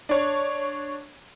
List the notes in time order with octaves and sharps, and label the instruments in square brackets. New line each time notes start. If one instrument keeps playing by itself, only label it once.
[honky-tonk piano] D4 C#5